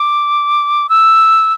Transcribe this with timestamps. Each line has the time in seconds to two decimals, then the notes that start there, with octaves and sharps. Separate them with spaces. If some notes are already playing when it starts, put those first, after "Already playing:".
Already playing: D6
0.89 E6